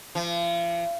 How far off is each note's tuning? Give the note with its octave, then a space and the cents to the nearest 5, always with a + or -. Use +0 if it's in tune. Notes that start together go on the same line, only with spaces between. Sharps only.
F3 -40